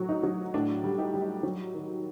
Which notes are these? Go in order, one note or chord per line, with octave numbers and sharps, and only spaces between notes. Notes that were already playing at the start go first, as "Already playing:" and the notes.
Already playing: A2 F#3 F#4
D#4
F#3
A2 D4
G3
D#4 G4
G3
D#4
F#3
D#3